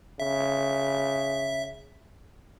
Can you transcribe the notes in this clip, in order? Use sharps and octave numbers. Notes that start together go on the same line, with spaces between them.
C#3 E5